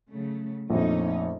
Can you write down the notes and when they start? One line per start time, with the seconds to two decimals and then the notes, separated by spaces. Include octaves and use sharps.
0.11 C#3 F#3 A3
0.70 A#1 F2 A3 C#4 D#4